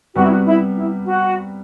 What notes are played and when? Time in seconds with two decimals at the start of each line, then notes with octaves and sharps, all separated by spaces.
0.15 C3 G3 B3 F#4
0.23 E4
0.30 F#4
0.46 E4
0.75 E4
1.06 F#4